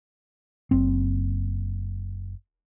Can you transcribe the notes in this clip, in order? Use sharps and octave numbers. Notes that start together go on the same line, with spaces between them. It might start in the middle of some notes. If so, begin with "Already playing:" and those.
F#1 C4